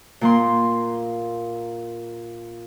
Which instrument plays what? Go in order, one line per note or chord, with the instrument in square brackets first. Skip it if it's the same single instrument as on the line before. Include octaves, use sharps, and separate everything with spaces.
[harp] A#2 A#3 C6